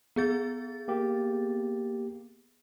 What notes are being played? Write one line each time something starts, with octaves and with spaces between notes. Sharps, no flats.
B3 G#4 A6
A#3 G4